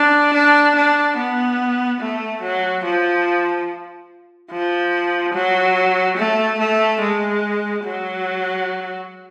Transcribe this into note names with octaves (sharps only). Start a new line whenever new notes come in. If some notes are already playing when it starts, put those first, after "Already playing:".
Already playing: D4
D4
D4
B3
A3
F#3
F3
F3
F#3
A3
A3
G#3
F#3